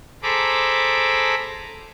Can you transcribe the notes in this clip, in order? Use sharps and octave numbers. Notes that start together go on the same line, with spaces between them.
G#4 A4 C5 A#5 B5 D6